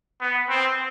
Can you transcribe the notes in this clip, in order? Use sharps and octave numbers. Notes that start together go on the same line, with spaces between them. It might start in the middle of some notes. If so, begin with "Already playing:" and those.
B3
C4